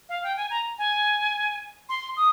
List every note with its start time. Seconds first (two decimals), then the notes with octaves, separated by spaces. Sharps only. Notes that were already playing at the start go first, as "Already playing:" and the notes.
0.09 F5
0.23 G5
0.37 G#5
0.51 A#5
0.78 G#5
1.89 C6
2.17 D#6